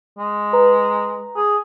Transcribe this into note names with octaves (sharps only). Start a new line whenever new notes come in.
G#3
B4 A#5
G#4